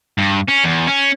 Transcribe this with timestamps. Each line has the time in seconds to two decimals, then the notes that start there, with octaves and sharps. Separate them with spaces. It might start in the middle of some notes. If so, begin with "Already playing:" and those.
0.18 G2
0.48 C#4
0.64 E2
0.87 C#4